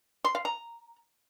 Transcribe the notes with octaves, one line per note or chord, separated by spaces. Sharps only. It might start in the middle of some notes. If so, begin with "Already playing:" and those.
C6
F5
A#5